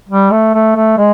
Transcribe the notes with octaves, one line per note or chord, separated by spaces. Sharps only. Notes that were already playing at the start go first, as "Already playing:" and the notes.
G3
A3
A3
A3
G#3